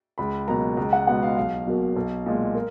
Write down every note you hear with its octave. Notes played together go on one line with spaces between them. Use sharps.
C#2 B5
B2 F#3 A#3 A#5
C#2 A#5
F#5
B2 G#3 B3 F#5
F5
B1 F5
B2 F#3 A#3
B1
A#2 G#3
A#4